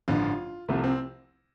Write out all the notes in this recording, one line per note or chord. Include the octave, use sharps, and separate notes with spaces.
A1 G2 D3 F3 F4
C2 C3 F3 A3
C4